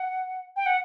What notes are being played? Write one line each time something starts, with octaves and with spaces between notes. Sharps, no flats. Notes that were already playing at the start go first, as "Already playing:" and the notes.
Already playing: F#5
G5
F#5